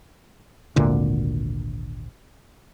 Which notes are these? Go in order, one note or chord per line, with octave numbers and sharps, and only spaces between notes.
G#1 D2 A#2 D3